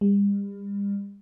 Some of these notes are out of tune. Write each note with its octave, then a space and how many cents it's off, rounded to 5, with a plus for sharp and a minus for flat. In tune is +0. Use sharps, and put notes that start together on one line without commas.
G3 +40